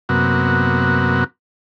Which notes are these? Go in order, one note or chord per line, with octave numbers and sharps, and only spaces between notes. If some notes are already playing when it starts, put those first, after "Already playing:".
F#2 C3 A#3 B3 F#4